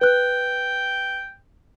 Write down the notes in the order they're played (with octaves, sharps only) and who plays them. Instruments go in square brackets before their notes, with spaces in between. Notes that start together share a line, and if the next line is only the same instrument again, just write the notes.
[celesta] B4 F#6 [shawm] G5